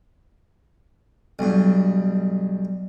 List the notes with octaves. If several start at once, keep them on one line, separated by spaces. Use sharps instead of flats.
B1 G2